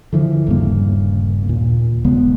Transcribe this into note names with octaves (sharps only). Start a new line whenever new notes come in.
D3 E3 F3
D#1 G2 C#3 A#3
D#2 A#2
D#1 C#3 G#3 B3